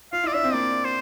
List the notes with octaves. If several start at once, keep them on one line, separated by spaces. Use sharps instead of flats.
F4 F5
E4 D5
D4 E5
C4
A#3 D5
C5